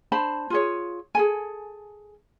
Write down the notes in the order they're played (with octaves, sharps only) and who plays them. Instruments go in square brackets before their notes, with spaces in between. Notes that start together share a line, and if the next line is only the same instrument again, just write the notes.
[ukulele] D4 C5 A5 B5
F4 G#4 C#5
G#4 A4 G#5